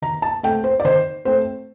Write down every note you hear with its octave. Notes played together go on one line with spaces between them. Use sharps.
D#3 A#5
A5
A3 C4 G5
C5
D5
D#3 C5
A3 C4 C5